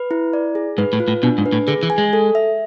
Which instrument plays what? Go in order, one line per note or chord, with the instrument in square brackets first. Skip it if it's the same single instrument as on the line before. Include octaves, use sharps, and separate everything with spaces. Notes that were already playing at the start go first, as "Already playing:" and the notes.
Already playing: [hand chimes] B4
E4
D5
G#4
[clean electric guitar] G#2 [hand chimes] B4
[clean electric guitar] A2
[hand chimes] F4
[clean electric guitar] A2
[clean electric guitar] B2 [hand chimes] D4
[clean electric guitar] G#2
[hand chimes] B4
[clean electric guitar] A2
[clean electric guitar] D3 [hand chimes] G#4
[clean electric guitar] E3
[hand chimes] G#5
[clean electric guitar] G#3
[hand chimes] A4
E5